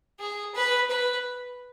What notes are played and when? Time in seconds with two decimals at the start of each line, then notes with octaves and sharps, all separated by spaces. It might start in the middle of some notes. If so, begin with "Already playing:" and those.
0.19 G#4
0.55 B4
0.90 B4